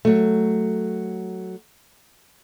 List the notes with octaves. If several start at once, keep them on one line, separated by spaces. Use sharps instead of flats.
F#3 A3